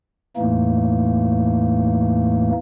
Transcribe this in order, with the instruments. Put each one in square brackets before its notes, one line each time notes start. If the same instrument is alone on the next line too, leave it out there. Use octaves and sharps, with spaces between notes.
[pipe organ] E2 A2 E3 A3 A#3 D#4